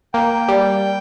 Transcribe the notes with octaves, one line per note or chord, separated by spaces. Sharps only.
A#3 G5
G3